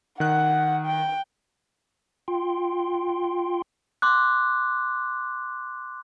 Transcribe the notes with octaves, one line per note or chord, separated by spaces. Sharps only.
D#3 F#5 F#6
G5
F4 G5 C6
C6 D6 F#6